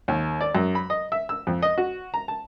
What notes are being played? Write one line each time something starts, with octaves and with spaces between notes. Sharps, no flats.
D#2
D5
F#2
B5
D#5
E5
E6
F2
D#5
F#4
A#5
A5